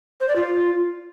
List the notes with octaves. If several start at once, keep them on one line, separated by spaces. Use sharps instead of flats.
C5
D5
F4